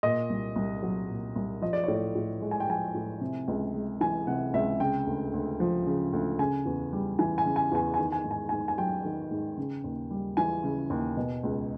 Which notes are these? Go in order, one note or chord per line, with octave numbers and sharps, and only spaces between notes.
A#2 D#5
C2
C2
F#3
A#2
C2
F3 D#5
D5
A2 C#5
D5
A2
G#3
G#5
G5
F3 G#5
A2
C3
C#2
G#3
E3 G#5
C3 F#5
C#2 E5
C#3 G5
D2
D2
F3
C#3
D2
C#3 G#5
E2
G3
E3 G#5
G#5
C#3
G#5
E2 G#5
G#5
D#3
G#5
G#2
G#5
G#2 G#5
G#5
F#3 G5
D#3
G#2
C#3
D#2
G3
E3 G#5
C#3
D#2
B2
C#2